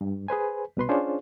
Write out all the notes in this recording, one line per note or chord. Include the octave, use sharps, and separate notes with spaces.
G2
G#4 B4 C5 G#5
C2 B2 B4 C6
C#4 D4 F4 G#4 C5 C#5